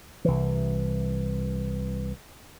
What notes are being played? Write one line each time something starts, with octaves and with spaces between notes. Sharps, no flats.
C2 E3